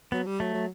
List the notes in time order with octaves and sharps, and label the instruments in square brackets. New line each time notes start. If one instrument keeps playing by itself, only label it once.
[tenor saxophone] F#3 [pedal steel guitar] B3
[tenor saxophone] G3
[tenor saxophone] F#3 [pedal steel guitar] A3
[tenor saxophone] F#3